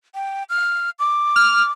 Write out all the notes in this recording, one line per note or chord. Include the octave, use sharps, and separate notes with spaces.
G5
F6
D6
F6